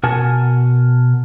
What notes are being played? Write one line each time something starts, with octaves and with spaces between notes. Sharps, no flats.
B2 A#4 F#5 G#5 A5